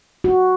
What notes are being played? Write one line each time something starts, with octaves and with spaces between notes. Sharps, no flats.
F#4